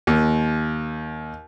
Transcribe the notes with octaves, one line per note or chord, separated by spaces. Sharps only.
D#2